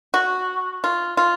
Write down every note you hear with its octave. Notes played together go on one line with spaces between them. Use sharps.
F#4
F4
F4